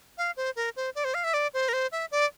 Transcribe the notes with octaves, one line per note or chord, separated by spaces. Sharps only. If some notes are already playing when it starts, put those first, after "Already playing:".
F5
C5
A#4
C5
D5
C5
F5
E5
D5
C5
A#4
C5
E5
D5